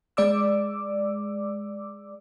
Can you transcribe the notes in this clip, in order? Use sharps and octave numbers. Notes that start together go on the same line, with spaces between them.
G#3 D5 D6 E6